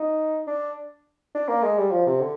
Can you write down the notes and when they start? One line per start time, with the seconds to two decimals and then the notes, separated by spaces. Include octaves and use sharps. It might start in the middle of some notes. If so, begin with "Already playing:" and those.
Already playing: D#4
0.47 D4
1.34 D4
1.48 A#3
1.63 G#3
1.78 G3
1.91 F3
2.06 C3
2.21 D3